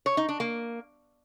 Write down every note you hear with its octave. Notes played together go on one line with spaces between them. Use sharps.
C#5
D#4
D4
A#3